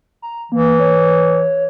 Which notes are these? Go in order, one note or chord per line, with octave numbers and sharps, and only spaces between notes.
A#5
E3 A#3
C#5